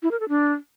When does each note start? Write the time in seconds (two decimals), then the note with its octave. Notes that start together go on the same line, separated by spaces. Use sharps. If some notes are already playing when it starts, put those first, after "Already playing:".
0.03 E4
0.11 A#4
0.20 A4
0.29 D4